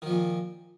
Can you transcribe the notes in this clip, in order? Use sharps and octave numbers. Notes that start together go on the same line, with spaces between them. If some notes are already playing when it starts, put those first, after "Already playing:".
A#2 D#3 F3